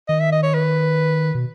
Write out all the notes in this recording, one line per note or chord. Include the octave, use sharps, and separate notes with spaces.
D#3 D#5
E5
D#5
C#5
B4
B2